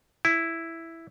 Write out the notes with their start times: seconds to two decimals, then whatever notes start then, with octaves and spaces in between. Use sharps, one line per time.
0.25 E4